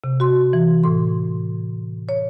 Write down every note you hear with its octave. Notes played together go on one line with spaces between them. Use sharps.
C3
F#4 C6
E3
A2 C6
C#5